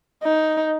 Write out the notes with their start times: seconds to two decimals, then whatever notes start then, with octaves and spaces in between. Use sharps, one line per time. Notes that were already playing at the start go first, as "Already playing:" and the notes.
0.24 D#4